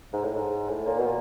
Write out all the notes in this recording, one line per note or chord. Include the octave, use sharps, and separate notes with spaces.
G#2
A2
G#2
A2
A#2
B2
A#2